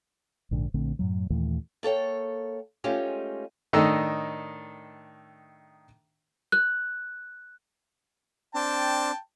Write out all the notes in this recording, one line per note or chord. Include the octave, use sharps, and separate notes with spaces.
A#1 G#2 D3
A#1 D3 A3 C4
F#2 A2 F#3
D#2 A#2 E3 A3
A#3 A4 C#5 G5
G#3 A3 C#4 D#4 F4 G4
A2 D#3 D4 A4 D#5 E6
F#6
C4 D4 G5 A5